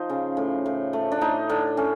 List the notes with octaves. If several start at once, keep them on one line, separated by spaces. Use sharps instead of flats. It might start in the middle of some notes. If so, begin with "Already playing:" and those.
Already playing: F3 D#4
C#3
A2
A2
A3
D4
A2 D#4
A2 D4
A2 C#4